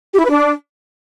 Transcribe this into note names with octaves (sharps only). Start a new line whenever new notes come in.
G4
E4
B4
D4